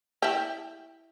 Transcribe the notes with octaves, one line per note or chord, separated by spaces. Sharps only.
E4 G4